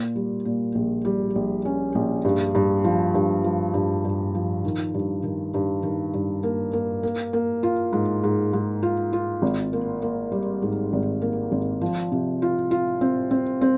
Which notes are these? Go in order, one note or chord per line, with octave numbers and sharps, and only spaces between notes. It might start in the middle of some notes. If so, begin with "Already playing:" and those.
Already playing: A#2
G3
A#2
A#1
G3
A#1
C#4
A#1
G2
G2
F3
G2
F3
G2
G2
F3
D#3
G2
D#3
G2
D#3
G2
A#3
A#3
A#3
A#3
F4
G#2
G#2
G#2
F4
F4
G#1
A#3
A#3
G3
G#2
G#1
A#3
G#1
F3
C3
F4
F4
C4
C4
C4